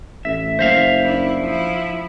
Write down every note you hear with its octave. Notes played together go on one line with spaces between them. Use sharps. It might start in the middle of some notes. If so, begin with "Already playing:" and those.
A1 E5
F#1 C5 E5 F5
D4 E4
F3 E4